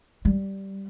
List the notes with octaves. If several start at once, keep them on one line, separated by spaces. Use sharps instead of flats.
G3